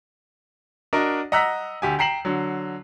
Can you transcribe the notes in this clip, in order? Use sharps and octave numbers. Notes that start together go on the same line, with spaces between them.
D4 F#4 A#4 D#5
D#5 F#5 A#5 E6 F#6 B6
D2 G4 G#5
G5 A#5 C7 E7 F#7
D3 F#3